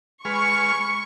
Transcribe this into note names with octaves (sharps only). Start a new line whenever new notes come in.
G#3 B4 C#6 F6